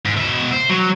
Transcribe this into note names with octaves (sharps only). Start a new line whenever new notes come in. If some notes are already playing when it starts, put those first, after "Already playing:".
G#2
B2 E5
C5
F#3